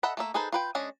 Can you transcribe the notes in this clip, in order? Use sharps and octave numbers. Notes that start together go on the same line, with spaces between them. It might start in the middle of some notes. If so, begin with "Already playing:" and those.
A4 D#5 E5 F#5 B5
A3 A#3 E5
D#4 G#4 A4 B4 C5
F4 B4 G5
G#3 C#4 D4 D#5